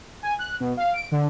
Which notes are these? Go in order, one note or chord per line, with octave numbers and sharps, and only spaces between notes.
G#5
F#6
B2
F5
D7
D3